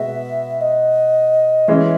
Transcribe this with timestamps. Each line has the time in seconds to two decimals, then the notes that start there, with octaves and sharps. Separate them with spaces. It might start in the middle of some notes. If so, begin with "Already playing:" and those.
Already playing: B2 G#3 B3 F#4 E5
0.61 D#5
1.68 E3 G#3 C#4 E5